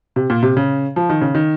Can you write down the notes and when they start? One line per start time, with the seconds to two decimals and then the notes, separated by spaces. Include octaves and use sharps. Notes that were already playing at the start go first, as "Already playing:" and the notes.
0.16 C3
0.30 A#2
0.43 C3
0.57 C#3
0.96 F3
1.10 D#3
1.21 C#3
1.35 D#3